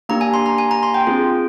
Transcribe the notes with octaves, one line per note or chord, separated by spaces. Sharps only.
A#3 D4 G4 A#5
G#5
C6
A#5
G#5
A#5
C6
G5
C4 F4 G#4